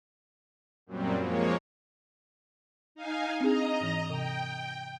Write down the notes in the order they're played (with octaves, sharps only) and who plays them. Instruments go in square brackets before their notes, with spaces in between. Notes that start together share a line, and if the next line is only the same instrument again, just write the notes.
[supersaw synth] F#2 A#2 F#3 G3 C4
F3 G#3 A#3 C#5
[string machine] D#4 F5 G#5
[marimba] C4 D4 G#4 [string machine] D#5 A#5
[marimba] G#2 E3
[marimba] C3 [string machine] G5